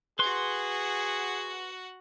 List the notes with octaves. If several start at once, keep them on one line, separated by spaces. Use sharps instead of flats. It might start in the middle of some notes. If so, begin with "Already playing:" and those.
F#4 G#4 B4 F#5 C6